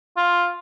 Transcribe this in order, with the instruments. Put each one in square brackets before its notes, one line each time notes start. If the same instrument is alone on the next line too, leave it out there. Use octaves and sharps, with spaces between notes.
[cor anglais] F4